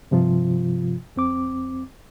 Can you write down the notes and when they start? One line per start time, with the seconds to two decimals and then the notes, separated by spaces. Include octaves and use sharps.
0.11 G2 C3 F3 F4
1.16 F2 C4 D6